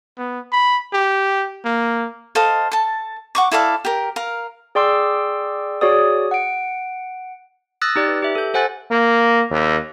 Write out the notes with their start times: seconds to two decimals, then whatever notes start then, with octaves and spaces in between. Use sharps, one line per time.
0.18 B3
0.52 B5
0.93 G4
1.65 A#3
2.35 A4 C5 D#5 F5
2.72 A4 A5
3.35 F#5 C#6 D6
3.52 E4 A4 D5 F5
3.85 G4 A#4
4.16 A#4 F5
4.75 G#4 D5 G5 C6 D6 E6
5.81 F#4 G#4 C#5 D5 D#6
6.31 F#5 D7
7.81 D#6 E6 F#6 A6 A#6
7.96 D#4 G4 D5 F#6
8.08 B4
8.22 G4 E5
8.35 A4 G6
8.54 A4 C5 F#5 G#5 F#6 A6
8.91 A#3
9.50 D#2